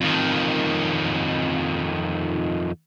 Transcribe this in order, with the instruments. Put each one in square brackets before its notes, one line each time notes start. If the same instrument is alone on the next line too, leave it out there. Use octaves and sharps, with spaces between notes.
[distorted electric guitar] F2 D#3